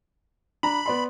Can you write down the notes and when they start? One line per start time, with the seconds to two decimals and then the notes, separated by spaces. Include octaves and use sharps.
0.63 D4 A#5 B5
0.86 B3 D5 C6